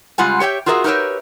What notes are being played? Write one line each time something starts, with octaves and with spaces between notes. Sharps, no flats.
C#3 G3 G#3 F4 F#5 G#5
G4 C#5 E5 G5
F4 F#4 G#4 A#4 D5 E5
D#4 G4 A#4 B4 C#5 E5